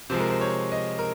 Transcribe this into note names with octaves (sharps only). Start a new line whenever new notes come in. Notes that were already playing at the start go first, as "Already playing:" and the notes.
C3 F3 G#3 C5
A#4
C5
C#5
D#5
A#4